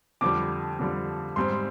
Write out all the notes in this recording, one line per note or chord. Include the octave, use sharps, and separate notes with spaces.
F2 D3 G3 D6
F2 D3 G3
G#2 G3 C4 C6